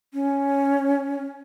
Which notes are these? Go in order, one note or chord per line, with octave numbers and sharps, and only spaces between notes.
C#4